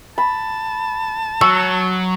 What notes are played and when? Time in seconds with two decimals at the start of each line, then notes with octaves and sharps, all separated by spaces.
0.18 A5 B5
1.41 F#3 C#6 E6